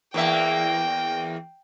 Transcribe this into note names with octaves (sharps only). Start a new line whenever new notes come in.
E2 A#3 E5 G5